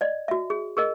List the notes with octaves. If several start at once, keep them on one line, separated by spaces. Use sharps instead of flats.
D5 D#5
F#4 E5
G#4
G#4 A#4 D#5